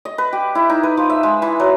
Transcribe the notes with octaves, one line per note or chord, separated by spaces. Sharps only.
D#5
B4
G4
E4
D#4
B4
F3
E5
G#3
E3
F#3